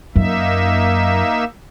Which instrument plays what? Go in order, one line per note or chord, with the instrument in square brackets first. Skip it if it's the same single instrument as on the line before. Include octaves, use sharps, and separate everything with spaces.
[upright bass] F#2 [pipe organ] A#3 D#4 E5